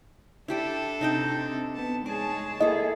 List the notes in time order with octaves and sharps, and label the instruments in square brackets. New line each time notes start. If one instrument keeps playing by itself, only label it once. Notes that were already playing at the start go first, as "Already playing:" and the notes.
[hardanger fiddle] D4 A4 [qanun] E4 G4 D5
[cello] C3 [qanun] D#4 D#5 G5
[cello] B3 [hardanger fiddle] A5
[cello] G#3 G#4 [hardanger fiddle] C#5 A5 [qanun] D5
[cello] A#3 G#4 [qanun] E4 A4 [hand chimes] D#5